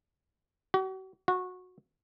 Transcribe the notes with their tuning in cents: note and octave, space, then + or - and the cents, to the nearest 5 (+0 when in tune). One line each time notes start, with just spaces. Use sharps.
F#4 +40
F#4 -20